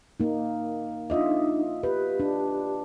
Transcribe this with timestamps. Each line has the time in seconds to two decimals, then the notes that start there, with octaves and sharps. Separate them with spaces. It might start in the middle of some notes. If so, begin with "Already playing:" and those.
0.20 A#3 D#4
1.10 D4 D#4 F4 D#5 E5
1.83 G4 B4
2.20 D4